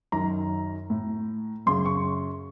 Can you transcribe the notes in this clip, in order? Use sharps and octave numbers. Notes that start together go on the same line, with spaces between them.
F#2 D#3 A#5
A2
F#2 C#3 C6
C#6